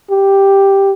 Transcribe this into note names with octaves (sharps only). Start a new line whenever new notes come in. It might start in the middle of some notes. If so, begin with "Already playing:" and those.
G4